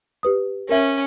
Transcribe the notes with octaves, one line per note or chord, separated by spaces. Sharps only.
G4 B4 D#6
C#4 A#4 E5